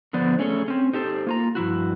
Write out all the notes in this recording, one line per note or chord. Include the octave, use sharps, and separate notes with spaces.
D3 F3 B3 C5 D5
A3 C#4 G#4 A4 C#5
C4 C#4
D#4 G4 A4 C5
A#3 F4 A#5
G2 F3 E4 F#4